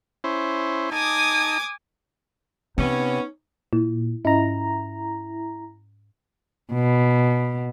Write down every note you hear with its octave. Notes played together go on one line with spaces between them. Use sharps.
C#4 E4 C5
D#4 G#5 A5 D6 D#6
C3 B3 C#4 D#4
A#2 E4
G#2 C#4 E4 D#5 A#5
B2